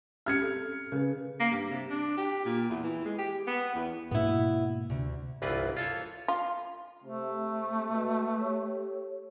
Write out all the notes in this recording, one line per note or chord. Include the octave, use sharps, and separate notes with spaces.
C4 C#4 G4 F6 G#6 C#7
A4
C#3 A#4 B4
A#3
G2
C3
D4
G4
A#2
E2
E3
G#3
G4
B3
E2
G#2 B2 A#3 B3 E4
D2 C3
G1 C2 E3 F4 B4 D5
F4 A4 C#5
F4
C3 A3
B2
G4 A4 C#5